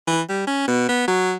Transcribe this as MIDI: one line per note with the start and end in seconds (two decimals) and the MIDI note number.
0.07 0.21 52
0.29 0.43 55
0.47 0.64 61
0.67 0.85 47
0.89 1.07 59
1.08 1.34 54